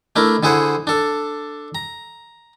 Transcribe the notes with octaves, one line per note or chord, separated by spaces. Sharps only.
A3 D4 E4 A#4
D3 E4 G#4 C5 F#5
D4 A4
A#5